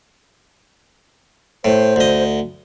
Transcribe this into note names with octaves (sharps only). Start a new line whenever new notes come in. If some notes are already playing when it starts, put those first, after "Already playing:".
A2 C5
D2 D#5